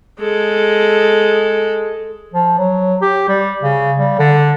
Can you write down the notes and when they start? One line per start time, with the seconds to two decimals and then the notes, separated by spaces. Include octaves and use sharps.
0.20 G#3 A4
2.34 F3
2.58 F#3
3.02 G4
3.29 G3
3.63 C#3
3.98 G3
4.19 D3